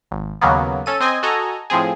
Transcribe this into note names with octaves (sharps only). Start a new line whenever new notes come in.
G#1
D#2 C#3 F#3 A#3 B3
C#4 A4 D#7
C4 D#5 G#5
F#4 A4 D#5 G#5 A#5
A2 F3 C4 G#4